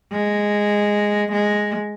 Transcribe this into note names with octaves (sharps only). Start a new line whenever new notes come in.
G#3
G#3